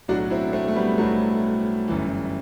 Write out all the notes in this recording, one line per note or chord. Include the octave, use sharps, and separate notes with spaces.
B1 A2 F#3 D4 F#4
C4 E4
A3 C4
A3
G3 B3
B1 A2 F#3 A3
G1 F#2 E3